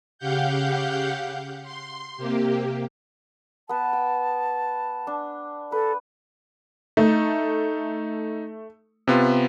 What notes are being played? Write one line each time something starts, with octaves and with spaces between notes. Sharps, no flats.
C#3 G4 F5 F#5 G6
C6
C3 A#3 G4
B3 B4 A5
G5
D4
A4 B4
A3 D#4
C3 B3 F4